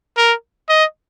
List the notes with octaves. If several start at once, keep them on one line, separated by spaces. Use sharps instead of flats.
A#4
D#5